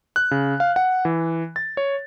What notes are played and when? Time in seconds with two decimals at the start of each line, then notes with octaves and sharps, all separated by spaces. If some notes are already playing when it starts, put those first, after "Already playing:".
0.16 F#6
0.31 C#3
0.60 F5
0.76 F#5
1.05 E3
1.56 A6
1.77 C#5